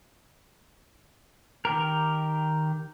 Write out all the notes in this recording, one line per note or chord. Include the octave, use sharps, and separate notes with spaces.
D#3 G4 A#4